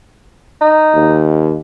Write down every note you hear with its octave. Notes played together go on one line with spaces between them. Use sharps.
D#4
D#2